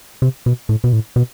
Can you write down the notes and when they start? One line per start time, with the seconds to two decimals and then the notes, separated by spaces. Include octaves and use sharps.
0.22 C3
0.46 B2
0.69 A2
0.84 B2
0.93 A2
1.16 B2